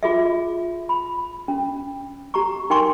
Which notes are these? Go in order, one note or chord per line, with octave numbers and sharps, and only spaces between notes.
F4 G#4 E5
B5
C#4
G4 A#5 C#6
D#4 A#4 G5 G#5 C6 C#6